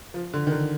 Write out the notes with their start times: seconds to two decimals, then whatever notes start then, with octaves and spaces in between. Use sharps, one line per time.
0.14 F3
0.34 D3
0.47 D#3
0.52 D3